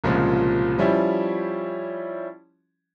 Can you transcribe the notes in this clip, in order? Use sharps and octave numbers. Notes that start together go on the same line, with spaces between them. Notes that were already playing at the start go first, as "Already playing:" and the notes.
C2 A#2 C#3 F3 G#3
F3 G3 C#4 E4